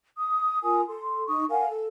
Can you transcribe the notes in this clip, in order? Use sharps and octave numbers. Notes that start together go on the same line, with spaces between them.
D#6
F4 A#4 G#5 D#6
A4 C6
D#4 C#6 D#6
A#4 F5 F#5 G#5
A4